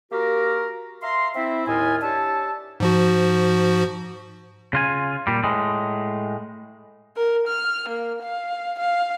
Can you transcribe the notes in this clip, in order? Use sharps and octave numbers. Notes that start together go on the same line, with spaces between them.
A#3 F#4 G4 A#4
E5 F5 A#5 C6
C4 E4 E5
D#2 A2 E4 F4 D#5 G#5
D4 G4 C#5 E5 A5
G#2 F3 F#4
C#3 F4 G#5
A#2 G3
A2 G#3
A#4
F6
A#3
F5
F5